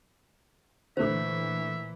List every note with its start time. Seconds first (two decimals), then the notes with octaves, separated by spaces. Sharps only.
0.97 A#2 D3 E3 A3 C5 E5